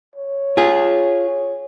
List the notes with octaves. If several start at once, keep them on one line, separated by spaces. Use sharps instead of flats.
C#5
F4 G#4